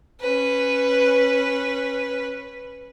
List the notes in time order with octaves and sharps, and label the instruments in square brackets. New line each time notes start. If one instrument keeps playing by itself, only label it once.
[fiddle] C#4 B4